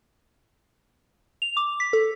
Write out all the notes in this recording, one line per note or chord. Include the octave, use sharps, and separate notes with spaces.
F7
D6
B6
A4